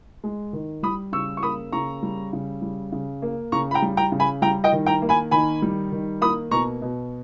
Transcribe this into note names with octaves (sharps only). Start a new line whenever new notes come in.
G#3
D#3
G3 B5 D#6
C#3 C#6 E6
C#6
A#3 B5 D#6
C#3 A#5 C#6
G3
C#3
G3
C#3
A#3
C#3 A#5 C#6
B5
G5 A#5
G3
G5 A#5
C#3
G#5 B5
G3 G5 A#5
D#5 G5
D#3
G5 A#5
A#3
G#5 B5
D#3 G#5 B5
G3
D#3
A#3 B5 D#6
B2 A#5 C#6
B2